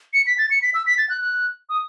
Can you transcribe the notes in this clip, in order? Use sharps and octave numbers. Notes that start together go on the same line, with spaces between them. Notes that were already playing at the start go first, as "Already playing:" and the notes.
C#7
B6
A6
C#7
B6
E6
B6
A6
F#6
F#6
D#6